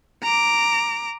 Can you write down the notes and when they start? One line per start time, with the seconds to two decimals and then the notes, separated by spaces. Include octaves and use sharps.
0.23 A#5 D6